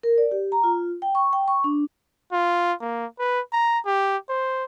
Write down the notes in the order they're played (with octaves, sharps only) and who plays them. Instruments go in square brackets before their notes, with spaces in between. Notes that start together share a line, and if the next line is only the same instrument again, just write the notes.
[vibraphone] A#4
D5
G4
A#5
F4
G5
C#6
G5
C#6
D4
[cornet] F4
A#3
B4
A#5
G4
C5